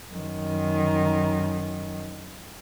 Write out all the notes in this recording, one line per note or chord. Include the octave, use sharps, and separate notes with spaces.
F#2 D#3